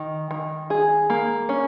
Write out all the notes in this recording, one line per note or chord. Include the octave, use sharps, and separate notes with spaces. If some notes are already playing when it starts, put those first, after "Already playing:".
Already playing: D#3
D#3
G#4
A#3
C#4